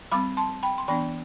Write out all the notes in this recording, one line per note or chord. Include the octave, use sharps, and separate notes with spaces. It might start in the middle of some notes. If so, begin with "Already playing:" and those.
G3 C4 B5 D6
A5 C6
G5 B5
C6
E3 B3 D4 G5 B5